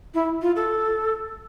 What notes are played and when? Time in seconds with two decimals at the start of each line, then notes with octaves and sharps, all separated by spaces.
0.14 E4
0.42 F4
0.56 A4